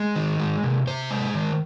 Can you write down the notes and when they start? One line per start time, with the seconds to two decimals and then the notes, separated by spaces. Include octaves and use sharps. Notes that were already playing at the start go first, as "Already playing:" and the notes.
Already playing: G#3
0.15 D#3
0.39 G#3
0.63 C3
0.87 C3 C5
1.11 G#3
1.35 D#3